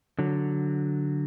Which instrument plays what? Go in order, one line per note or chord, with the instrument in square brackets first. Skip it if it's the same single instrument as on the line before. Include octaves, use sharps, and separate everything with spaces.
[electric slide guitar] D3 F#3